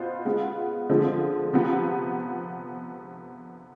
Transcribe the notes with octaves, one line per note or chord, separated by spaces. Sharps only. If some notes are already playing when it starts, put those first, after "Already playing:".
Already playing: B2 B3 F4 C5
G#3 B3 F4
D3 F3 G#3 C4
C3 F3 B3